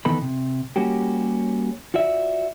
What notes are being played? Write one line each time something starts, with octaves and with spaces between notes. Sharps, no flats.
D#3 E3 B3 D#4 A4 B5
C3
G3 A#3 C#4 F#4 G4
F4 F#4 D5 E5